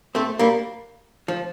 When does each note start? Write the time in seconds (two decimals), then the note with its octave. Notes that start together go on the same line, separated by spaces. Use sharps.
0.15 A3 C4
0.39 G3 A#3
1.28 F3